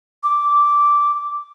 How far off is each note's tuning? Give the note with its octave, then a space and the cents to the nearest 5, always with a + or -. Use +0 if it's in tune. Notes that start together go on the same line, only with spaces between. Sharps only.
D6 -10